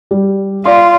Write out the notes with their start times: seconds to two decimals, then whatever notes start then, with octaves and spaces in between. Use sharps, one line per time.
0.11 G3
0.65 F4 D5 C6